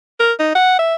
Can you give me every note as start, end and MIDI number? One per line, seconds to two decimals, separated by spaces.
0.20 0.33 70
0.39 0.52 63
0.55 0.78 78
0.79 0.95 76